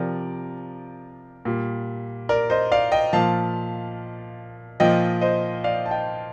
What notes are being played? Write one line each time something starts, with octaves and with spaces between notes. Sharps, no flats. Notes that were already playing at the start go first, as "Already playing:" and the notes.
Already playing: C3 F3 A#4 D5
A#2 G3
A#4 D5
C5 D#5
D5 F5
D#5 G5
A#2 F3 F5 A5
A#2 F3 D#5 G5
C5 D#5
D5 F5
A5
D#5 G5